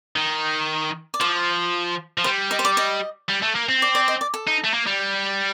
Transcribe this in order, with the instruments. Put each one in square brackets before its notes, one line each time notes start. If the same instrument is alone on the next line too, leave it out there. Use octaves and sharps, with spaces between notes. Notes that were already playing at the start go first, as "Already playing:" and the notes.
[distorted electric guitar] D#3
[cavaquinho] D5
[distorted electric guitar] F3 [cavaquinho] C5
[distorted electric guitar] F3
[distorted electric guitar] G3 [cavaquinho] C5
[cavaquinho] D#5
C5
D5
D#5
[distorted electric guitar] G3
A3
A#3
C4
[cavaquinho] D5
D5
D#5
D5
A4
[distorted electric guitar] D#4
A3
A#3
G3